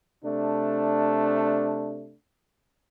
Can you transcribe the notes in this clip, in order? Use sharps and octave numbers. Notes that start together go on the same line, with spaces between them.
C3 A3 D4